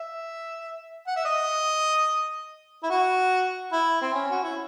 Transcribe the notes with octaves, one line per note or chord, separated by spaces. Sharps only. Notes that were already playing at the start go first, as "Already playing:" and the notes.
Already playing: E5
F#5
E5
D#5
E4
F#4
E4
C4
C#4
F#4
E4